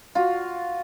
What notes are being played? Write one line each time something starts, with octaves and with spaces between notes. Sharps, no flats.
F4 F#4